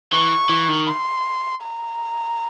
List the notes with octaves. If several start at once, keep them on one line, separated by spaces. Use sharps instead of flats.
E3 C#6
E3
D#3
C6
A#5